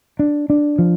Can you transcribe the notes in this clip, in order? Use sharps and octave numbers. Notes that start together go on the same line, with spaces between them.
D4
D4
F3